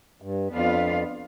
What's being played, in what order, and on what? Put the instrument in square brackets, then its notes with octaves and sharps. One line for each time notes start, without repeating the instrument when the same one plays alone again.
[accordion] G2
[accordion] F2 [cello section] B3 D4 F4 B4 F5